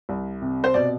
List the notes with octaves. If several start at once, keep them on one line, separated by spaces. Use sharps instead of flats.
C2
C3
C5
B2 D5